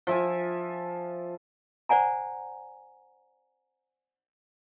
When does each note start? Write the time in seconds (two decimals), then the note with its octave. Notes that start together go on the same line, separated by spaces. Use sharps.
0.07 F3 E5 G#5
1.89 C5 D5 F#5 G#5 A#5